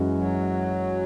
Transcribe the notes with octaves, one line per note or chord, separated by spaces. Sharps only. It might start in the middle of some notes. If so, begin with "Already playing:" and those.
Already playing: F#2 E3 G#3 C#4 F#4
F#3